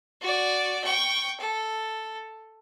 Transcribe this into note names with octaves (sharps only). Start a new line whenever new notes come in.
F#4 D5
G5 C#6
A4